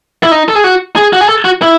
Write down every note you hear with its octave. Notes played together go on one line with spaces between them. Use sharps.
E4
D#4
A4
G#4
F#4
G#4
F#4
G#4
A4
F#4
E4